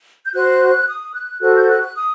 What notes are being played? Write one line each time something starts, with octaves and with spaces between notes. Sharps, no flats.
G6
F#4 C5 F#6
D#6
F#6
F#4 A4 C5 F#6
G6
F#6
F#6
D#6